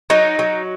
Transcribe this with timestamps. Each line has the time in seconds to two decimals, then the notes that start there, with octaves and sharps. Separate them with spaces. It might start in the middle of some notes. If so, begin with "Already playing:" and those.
0.10 F#3 D#4
0.39 F#3